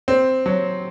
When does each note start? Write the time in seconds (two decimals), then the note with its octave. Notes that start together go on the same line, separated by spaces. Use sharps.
0.08 C4
0.46 F#3